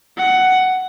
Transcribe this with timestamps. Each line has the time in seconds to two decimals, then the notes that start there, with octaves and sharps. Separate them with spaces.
0.17 F#5